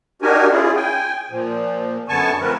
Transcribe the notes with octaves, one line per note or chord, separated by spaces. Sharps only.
D4 D#4 F#4 G4 A#4 G#5
C#4 E4 F4 G#4
G5 G#5
A#2 F3
F#2 D3 B3 G#5 A5 C#6
F3 A3 C4 A#4 B4